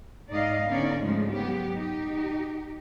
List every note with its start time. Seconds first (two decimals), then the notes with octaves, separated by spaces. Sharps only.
0.29 G#2 D#4 D5 D#5 F5
0.68 D3 B3 C#4 D#4 D5
1.01 G#2 C#3 F3 G#3 A3
1.32 F#3 B3 G4
1.74 D#4 G4